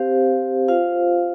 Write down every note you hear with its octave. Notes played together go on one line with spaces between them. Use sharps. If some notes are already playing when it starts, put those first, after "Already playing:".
Already playing: C4 G4 C5 F5
F4 C5 F5